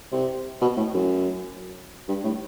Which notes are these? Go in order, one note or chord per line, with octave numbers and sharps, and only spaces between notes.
C3
B2
A2
F#2
G2
A2